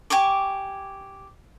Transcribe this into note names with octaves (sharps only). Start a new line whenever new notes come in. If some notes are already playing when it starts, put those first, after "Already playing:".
G4 G#5 C#6 D6